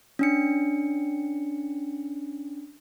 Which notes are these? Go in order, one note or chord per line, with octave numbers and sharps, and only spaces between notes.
C#4 D4 C#7